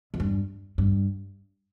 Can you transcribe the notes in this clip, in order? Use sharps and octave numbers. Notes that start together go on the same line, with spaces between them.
F2
G2
G2